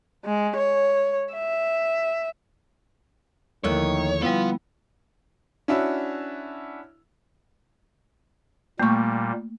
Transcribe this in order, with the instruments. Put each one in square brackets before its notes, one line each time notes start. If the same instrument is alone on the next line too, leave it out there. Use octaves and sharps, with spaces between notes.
[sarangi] G#3
C#5
E5
[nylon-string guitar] D#2 A3 [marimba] D3 F3 E4 [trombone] D#3 [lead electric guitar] C#5
[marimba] G3 E4 [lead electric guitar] B3 [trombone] F4
[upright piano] C#4 D4 E4 F#4
[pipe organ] A#2 G3 [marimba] A3 [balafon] A#3 C#6